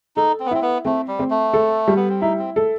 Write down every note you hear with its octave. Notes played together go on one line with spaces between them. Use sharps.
D#4 A4
C4
B3
C4 E4
B3
A3 C4
G3
C4
A3
A4
G3
B3
C4
D#4 E4
C4
A4